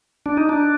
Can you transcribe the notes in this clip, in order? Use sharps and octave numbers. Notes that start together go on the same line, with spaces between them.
D4
D#4
D4